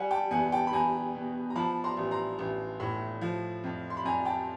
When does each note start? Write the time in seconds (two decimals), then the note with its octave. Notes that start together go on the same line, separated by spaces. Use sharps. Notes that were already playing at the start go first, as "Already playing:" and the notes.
Already playing: G3 F#5 G#5
0.11 G5 A5
0.31 E2 F#5 G#5
0.52 G5 A5
0.67 B5
0.73 E2 G#5 A#5
1.15 B2
1.50 A#5
1.56 F3 A5 B5
1.84 A#5 C6
1.97 A1
2.11 A#5 C6
2.39 A1
2.80 A2
3.21 F3
3.64 F2
3.90 C6
3.97 B5
4.05 F2 G#5 A#5
4.25 G5 A5